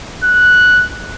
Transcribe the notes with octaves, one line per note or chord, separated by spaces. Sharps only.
F#6